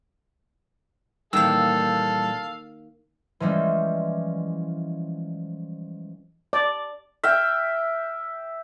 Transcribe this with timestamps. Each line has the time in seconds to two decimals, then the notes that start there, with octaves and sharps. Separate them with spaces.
1.33 A#2 D#3 E3 G3 A#3 A4 F5 E6
3.40 E3 F3 G3 G#3 C#4
6.53 D5
7.24 E5 G5 F6